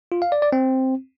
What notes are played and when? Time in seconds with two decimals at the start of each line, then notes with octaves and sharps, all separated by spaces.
0.12 F4
0.22 F5
0.32 D5
0.42 D5
0.52 C4